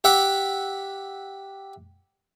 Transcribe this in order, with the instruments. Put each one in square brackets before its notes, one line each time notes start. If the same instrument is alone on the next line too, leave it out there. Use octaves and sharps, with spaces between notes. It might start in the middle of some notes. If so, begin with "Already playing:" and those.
[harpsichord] G4 E5 F#5 D6